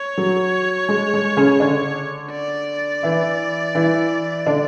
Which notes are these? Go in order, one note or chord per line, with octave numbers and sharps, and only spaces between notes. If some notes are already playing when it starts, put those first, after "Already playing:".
Already playing: C#5
F#3
G#3
G#3
C#3 C#4
D3 D4
D5
E3 E4
E3 E4
D3 D4